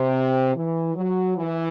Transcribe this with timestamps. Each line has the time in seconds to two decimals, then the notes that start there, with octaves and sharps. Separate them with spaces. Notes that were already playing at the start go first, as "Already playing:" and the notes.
Already playing: C3
0.55 E3
0.95 F#3
1.37 E3